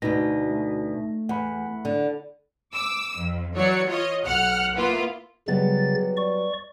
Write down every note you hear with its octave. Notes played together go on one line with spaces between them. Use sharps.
D2 B2 D#4 A#6
A3
E2 F#5 B5
D3
D6 E6
F2
E3 F#3 C#5 D5 C#7
F4 C#5 D#5
B1 F#5 F6 F#6 C#7
A#3 B3 E4 F4
C#3 F#3 G3 B3 A6
D5 C#6